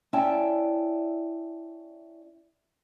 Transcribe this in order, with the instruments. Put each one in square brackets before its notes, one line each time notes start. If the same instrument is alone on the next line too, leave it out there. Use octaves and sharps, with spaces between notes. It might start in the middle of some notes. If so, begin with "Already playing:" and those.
[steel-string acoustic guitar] C#4 E4 D5 E5 G5 A5